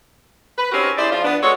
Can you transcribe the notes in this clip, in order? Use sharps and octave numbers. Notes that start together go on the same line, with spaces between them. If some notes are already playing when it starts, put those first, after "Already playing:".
B4
C4 C#4 D#4 F#4 G4 A#4
E4 G4 G#4 C5 D5
F3 F4
B3 D4
G#3 F#4 A4 C#5